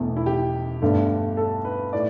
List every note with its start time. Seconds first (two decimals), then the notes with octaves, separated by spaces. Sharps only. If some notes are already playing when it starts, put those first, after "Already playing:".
Already playing: E1 E2 B2 A3
0.16 E4
0.26 G4
0.82 G1 G2 D3 A3
1.37 A4
1.65 B4
1.93 A2 D5